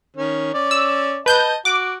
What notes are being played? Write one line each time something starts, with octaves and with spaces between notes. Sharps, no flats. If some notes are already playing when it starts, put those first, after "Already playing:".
D#3 C#4
C#4 D5
E6
B4 D#5 A5 G6
F#4 D6